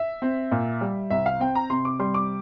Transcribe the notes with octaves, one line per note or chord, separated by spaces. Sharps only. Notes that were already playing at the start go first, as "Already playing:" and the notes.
Already playing: E5
C4
A#2
G3
C2 E5
F5
C4 G5
A#5
C3 C6
D6
G3 C6
D6